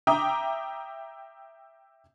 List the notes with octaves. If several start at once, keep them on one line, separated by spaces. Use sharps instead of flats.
E5 G5 A#5 D6 D#6